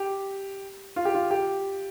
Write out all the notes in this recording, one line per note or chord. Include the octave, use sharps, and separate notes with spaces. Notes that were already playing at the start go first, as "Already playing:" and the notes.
Already playing: G4
F4
G4
F4
G4